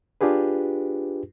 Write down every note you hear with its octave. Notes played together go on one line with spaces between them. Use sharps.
D4 F4 G4 G#4 B4